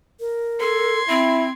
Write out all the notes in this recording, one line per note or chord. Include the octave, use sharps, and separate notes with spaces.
A#4
A4 C6 G#6
C4 E4